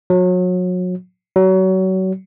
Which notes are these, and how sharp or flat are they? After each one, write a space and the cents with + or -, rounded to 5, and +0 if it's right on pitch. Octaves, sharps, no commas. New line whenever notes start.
F#3 -30
F#3 +30